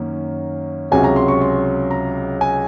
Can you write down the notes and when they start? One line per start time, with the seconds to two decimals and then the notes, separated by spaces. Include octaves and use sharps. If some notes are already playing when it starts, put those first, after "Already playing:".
Already playing: F#2 D#3 A#3 C#4
0.91 C#2 C3 F#3 C#4 G#5
1.04 A#5
1.16 C6
1.28 C#6
1.41 C6
1.91 A#5
2.41 G#5